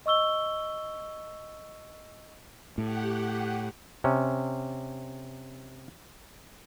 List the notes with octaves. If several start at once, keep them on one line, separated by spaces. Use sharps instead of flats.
D#5 C#6 E6 G7
A2 G4 F#5
C3 C#4